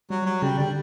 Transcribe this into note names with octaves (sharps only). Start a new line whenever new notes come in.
F#3 G3
F#3
C#3 G3
D3 G3